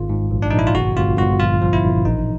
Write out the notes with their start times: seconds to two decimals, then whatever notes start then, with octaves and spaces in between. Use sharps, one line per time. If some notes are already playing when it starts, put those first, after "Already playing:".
Already playing: G#1 F4
0.09 G#2
0.31 A#1
0.42 D4
0.51 A#1 D#4
0.59 E4
0.67 F4
0.75 G1 F#4
0.96 G1 F4
1.18 G1 F#4
1.40 A#1 F4
1.62 F3
1.73 E4
1.83 A#1
2.05 A1 D#4